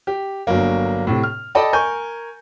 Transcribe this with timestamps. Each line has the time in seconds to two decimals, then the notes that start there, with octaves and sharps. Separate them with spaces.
0.07 G4
0.47 G1 F#3 A#3
1.07 A2 C3
1.23 F6
1.55 A4 D5 D#5 G5 A5 B5
1.73 A#4 G#5 C#6 G6